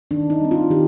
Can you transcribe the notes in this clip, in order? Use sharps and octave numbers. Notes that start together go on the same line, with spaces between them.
D#3 D4
D#4
G3 C4
F4
D#3 G4